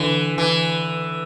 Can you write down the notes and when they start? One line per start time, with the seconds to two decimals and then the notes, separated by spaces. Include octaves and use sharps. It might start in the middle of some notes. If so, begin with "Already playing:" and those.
Already playing: D3 E3
0.38 E3